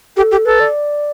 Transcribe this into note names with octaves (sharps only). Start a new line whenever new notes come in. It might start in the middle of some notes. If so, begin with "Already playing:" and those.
G4 A4
G4
A4 B4
D5